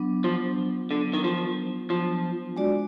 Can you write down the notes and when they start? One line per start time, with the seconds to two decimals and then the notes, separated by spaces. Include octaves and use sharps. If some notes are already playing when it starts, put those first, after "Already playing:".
Already playing: F#3 B3 D4
0.24 F3
0.91 D3
1.13 D#3
1.24 F3
1.90 F3
2.56 G#3 D4 F#4 D5